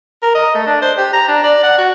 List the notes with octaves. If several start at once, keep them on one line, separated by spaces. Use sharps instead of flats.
A#4
D#5
A3
D4
C5
G4
A#5
D4
D5
F#5
F#4